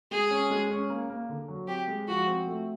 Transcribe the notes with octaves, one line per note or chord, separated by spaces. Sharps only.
G#3 G#4
C#4
G#3
C#4
A#3
A#3
D3
F#3
C4 G4
G#3
F3 F#4
C4
A3